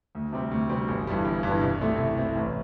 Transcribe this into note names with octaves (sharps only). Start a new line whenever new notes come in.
D2
C3 G3 C4
D2
C3 G3 C4
G1
G2 E3 G3
G1
G2 E3 G3
C2
C3 A3 C4 E4
C2
C3 A3 C4 E4
A1